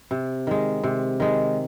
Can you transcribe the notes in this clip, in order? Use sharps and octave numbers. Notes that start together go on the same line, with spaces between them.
C3
D#3 G#3
C3
D#3 G#3